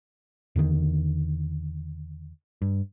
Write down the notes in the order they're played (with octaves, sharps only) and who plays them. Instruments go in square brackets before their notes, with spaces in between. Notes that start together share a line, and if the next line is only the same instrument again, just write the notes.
[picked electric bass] E2 D3 D#3
G2